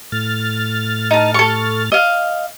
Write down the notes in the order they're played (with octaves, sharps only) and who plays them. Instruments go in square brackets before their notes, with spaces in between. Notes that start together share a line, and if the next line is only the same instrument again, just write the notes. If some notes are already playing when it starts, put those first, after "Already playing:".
[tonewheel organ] A2 F6 A6
[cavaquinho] D#4 A5
A4 C#6
D#5 F5